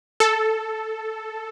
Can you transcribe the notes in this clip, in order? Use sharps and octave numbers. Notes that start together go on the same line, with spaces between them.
A4